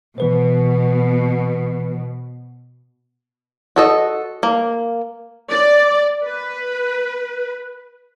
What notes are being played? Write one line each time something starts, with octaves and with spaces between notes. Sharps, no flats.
B2 E3 B4 C5
F#4 A4 D#5
A#3
D5
B4